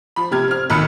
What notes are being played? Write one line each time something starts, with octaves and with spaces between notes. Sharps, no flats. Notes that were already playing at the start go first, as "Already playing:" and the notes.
F3 B5
C3 G4 F6 G#6
C4 F6
B1 D#3 B5 E6 F#6 C#7